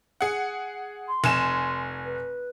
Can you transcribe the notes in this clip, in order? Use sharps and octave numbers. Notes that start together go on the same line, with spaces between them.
G#4 F#5
C6
F1 G#5 E7
B4